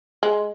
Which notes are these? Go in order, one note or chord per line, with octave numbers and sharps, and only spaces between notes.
G#3